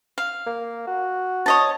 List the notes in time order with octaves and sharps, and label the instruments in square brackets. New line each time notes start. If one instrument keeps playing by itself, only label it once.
[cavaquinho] F5
[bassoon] A#3
F#4
[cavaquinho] C#5 D#5 A5